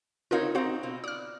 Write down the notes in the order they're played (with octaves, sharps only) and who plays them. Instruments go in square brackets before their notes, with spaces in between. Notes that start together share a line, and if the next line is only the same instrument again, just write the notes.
[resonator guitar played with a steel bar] C4 D#4 C#5 [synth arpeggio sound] F4 A#4 F5
[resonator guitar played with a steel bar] C4 D#4 [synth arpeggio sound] F#4 C5 F5
[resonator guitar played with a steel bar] B2 C4 F4
[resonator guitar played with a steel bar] D5 [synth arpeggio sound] D#6 F6